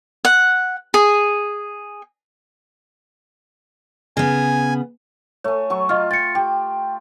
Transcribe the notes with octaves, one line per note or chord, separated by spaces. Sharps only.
F#5
G#4
C#3 B3 G#5
A3 C#5 G#5
F#3 C#6
F4 D#5 F6
G5 A6 C#7
G4 G5